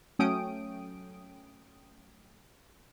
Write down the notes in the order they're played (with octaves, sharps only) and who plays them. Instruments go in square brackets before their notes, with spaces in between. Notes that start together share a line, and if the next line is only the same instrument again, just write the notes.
[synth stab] F#3 A3 C#4 G5 D#6 D7